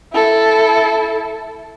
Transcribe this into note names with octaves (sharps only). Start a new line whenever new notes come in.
E4 A4